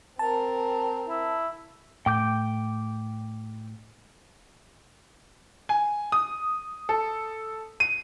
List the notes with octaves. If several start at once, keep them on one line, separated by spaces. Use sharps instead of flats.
C4 A#4 A5
E4
A2 G5 D6 G6
G#5
D#6
A4
D#7